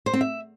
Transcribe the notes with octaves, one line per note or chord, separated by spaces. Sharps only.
C5
C4
E5